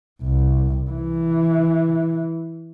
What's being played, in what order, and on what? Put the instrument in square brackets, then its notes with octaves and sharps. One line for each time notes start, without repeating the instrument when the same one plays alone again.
[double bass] C2
E3